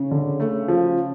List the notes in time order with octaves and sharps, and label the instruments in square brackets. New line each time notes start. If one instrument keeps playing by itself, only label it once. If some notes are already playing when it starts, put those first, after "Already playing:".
Already playing: [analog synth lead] C#3
[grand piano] D3
A3
F3